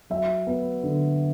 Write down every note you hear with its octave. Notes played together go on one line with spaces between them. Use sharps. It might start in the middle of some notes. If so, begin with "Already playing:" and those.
F#3 E5
B3
D3